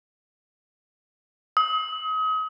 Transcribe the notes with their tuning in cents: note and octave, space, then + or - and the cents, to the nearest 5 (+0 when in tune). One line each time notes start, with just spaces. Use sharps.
D#6 +35